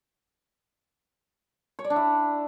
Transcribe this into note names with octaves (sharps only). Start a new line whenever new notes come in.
C#5
D5
D4
E4